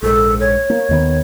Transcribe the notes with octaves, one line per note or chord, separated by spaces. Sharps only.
A#1 G#2 A4
C#5
A#3
D#2 D#3 B3